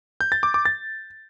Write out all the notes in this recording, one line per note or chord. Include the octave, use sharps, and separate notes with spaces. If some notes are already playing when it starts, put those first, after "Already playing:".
G6
A6
D6
D6
A6